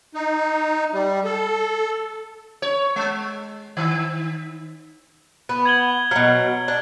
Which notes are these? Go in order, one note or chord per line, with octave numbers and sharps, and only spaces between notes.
D#4
G3
A4
C#5
G#3
D#3
B3
G#6 F#7 G7
B2 F#3 F6
D4